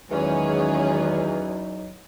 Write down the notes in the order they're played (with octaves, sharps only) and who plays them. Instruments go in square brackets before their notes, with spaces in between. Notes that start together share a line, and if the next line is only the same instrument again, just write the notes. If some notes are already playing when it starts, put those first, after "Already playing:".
[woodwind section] E2 [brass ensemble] D#3 E3 G#3 [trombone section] F#3 D#4 [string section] C#4 G#4